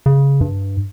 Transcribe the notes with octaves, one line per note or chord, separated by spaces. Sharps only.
C#3
G2